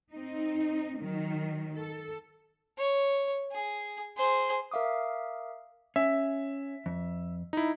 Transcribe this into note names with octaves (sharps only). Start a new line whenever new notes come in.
C4 D#4
D#3 F#3
A4
C#5
G#4
G#4 C5
A#4 E5 F5 D6 D#6
C#4 E5
F2
D#4 E4